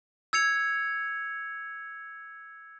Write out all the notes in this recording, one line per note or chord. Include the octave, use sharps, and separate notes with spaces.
E6 G#6 C#7 F7